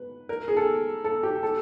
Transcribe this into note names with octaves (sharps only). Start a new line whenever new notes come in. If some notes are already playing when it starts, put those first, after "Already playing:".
Already playing: B4
A#4
G#4
A4
A4
G4
A4